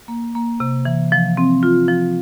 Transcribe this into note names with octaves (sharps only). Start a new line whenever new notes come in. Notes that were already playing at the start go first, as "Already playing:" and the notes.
A#3
A#3
C3
E3
F3
C4
F4
F3